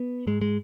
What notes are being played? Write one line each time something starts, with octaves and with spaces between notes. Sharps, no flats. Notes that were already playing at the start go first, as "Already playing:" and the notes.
Already playing: B3
G#2 G#3
G#3